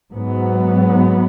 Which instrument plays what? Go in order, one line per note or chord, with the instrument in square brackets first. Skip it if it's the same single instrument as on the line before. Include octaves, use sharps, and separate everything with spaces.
[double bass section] G#2 F#3 B3